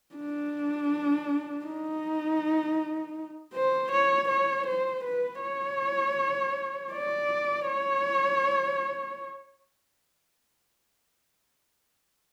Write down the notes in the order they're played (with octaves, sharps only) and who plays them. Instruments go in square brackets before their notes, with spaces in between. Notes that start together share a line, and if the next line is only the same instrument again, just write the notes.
[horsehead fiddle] D4
D#4
C5
C#5
C#5
C5
B4
C#5
D5
C#5